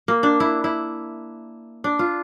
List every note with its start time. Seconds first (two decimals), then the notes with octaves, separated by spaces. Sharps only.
0.08 A#3
0.23 D4
0.40 E4
0.64 E4
1.84 D4
1.99 F4